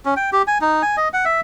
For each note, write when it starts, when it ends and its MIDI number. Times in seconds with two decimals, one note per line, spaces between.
0.05 0.14 61
0.17 0.30 79
0.33 0.42 67
0.47 0.58 80
0.61 0.82 63
0.82 0.96 80
0.97 1.08 75
1.14 1.25 78
1.25 1.41 76